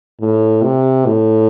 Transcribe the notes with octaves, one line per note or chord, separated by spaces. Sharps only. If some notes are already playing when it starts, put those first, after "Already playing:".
A2
C3
A2